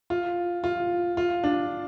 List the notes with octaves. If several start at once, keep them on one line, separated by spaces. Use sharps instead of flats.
F4
F4
F4
D4